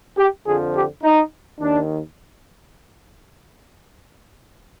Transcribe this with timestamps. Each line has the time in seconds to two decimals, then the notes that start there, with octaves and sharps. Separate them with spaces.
0.17 G4
0.45 F2 D3 F3 G#4
0.73 G4
1.02 D#4
1.59 D#2 D#3 D4